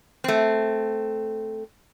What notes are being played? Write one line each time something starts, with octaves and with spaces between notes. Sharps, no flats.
A3 C4